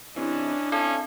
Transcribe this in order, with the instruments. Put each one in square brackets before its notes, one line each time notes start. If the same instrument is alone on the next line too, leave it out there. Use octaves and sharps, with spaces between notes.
[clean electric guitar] C3 E3 [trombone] C#4 [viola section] D4 E4 D#5
[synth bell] C4 [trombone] C#4 [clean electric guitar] A4